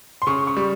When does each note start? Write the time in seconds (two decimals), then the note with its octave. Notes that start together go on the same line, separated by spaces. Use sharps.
0.22 C6
0.27 C#3 C#6
0.47 C#6
0.57 G3